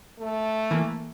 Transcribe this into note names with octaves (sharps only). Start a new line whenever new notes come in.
A3
E3 A#3